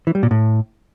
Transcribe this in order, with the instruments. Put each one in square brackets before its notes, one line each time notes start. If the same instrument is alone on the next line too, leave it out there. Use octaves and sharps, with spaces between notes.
[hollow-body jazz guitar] E3
G3
A#2
A2